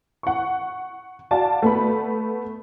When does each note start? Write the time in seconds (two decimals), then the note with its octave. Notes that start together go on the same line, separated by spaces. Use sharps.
0.23 F#5 C#6
1.31 F#4 D5 F5 A5
1.62 A3 B3 B5